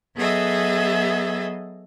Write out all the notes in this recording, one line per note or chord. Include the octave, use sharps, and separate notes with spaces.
F#3 B3 G#4 A4 D#5 E5